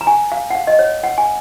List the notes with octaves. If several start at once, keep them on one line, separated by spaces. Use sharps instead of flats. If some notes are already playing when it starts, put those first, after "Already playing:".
A#5
G#5
F5
F#5
F5
D#5
C#5
F#5
G#5